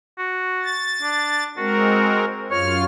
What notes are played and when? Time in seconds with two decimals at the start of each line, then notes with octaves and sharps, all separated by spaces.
0.18 F#4
0.63 A6
1.02 D4
1.57 G#3 C4 F#4 A#4
2.51 F#2 F4 C#5 F6